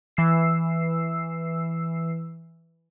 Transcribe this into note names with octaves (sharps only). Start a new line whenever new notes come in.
E3 E6 C7